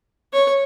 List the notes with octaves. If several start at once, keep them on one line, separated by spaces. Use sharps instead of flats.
C#5